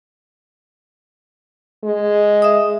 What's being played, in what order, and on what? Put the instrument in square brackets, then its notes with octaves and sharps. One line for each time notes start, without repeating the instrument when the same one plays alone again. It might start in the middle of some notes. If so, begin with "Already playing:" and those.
[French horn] G#3
[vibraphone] E5 D#6